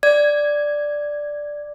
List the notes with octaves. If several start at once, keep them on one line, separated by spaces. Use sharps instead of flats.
D5 G#6